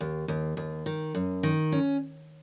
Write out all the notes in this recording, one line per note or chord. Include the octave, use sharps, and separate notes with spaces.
D#2
D#2
D#2
D#3
F#2
D#3
C#4